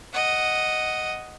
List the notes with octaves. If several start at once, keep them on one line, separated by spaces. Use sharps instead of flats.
D#5 F#5